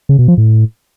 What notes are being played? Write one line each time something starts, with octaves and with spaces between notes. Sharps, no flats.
C#3
B2
F3
A2